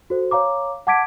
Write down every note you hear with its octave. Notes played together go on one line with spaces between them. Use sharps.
F#4 A4 C5
C#5 F5 A#5 D6
F#5 A5 D6 G#6 B6 D7